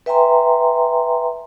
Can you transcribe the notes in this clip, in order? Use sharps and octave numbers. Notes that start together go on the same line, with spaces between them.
B4 E5 G5 G#5 A#5 C6